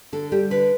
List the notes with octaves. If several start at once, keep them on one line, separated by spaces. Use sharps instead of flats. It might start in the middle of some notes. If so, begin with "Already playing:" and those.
D3 A4
G3 G4
D3 B4